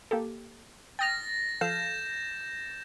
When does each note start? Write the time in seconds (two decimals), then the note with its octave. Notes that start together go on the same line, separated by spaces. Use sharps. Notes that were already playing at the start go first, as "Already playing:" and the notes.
0.11 A#3 G4 A4
0.99 G5 D#6 F6 A6 A#6
1.61 F3 A4 F5 G6 E7